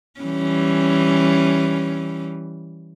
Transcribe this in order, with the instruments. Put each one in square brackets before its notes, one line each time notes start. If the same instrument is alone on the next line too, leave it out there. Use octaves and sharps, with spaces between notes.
[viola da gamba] E3 G3 C#4